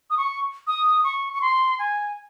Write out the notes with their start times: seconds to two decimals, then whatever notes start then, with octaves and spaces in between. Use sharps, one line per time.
0.10 D#6
0.17 C#6
0.67 D#6
1.04 C#6
1.33 C#6
1.42 C6
1.79 G#5